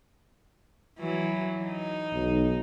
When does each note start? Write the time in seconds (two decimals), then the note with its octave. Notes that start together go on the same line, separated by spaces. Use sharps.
0.98 E3 F#3
1.65 D#4
2.13 B1